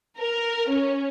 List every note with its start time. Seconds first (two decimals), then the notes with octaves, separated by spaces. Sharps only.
0.18 A#4
0.71 C#4